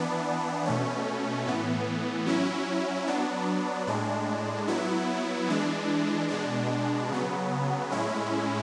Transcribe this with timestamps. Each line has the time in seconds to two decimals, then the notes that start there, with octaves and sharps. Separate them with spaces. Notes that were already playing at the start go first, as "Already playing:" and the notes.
Already playing: E3 B3 D4
0.65 B2 A3 C#4
1.46 A2 E3 B3
2.26 F#3 C#4 E4
3.07 F#3 B3 D4
3.87 A2 G#3 D4
4.68 F#3 B3 E4
5.48 E3 G#3 D4
6.28 B2 G#3 D4
7.09 C#3 F#3 B3
7.90 A2 G#3 C#4 E4